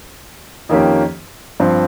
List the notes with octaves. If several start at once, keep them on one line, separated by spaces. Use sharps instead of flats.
F2 D#3 A#3 C#4 G4
G2 F3 C4